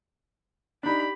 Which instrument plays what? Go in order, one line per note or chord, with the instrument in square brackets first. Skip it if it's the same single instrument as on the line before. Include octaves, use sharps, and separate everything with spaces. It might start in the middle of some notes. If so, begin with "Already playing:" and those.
[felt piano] D4 D#4 [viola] G4 B5